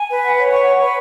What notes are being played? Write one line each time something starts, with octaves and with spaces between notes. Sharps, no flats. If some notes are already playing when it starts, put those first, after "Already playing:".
Already playing: G#5
B4
F#5
C#5
C#6
F#5
B4